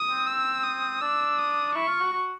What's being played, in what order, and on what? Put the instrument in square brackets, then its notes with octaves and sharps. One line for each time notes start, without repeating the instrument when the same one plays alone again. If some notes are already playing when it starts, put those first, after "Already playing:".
Already playing: [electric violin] D#6
[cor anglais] C4
[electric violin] E6
D#6
[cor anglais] D4 [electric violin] E6
[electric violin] D#6
[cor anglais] E4 [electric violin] C#6
[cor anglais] F4
F#4
F#4